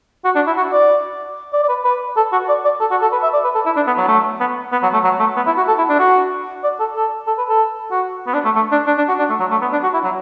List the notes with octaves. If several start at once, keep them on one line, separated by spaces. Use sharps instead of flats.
F#4
D4
E4
F#4
D5
D5
D5
B4
B4
A4
F#4
D5
D5
A4
F#4
A4
B4
E5
D5
B4
A4
E4
D4
B3
F#3
A3
B3
B3
F#3
A3
F#3
A3
B3
E4
F#4
A4
E4
D4
F#4
D5
A4
A4
A4
B4
A4
F#4
B3
D4
A3
A3
D4
D4
D4
F#4
D4
A3
F#3
A3
B3
D4
F#4
E4
F#3